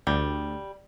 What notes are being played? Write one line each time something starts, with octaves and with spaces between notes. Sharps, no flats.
D2 G3